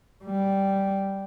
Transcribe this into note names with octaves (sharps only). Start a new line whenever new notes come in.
G3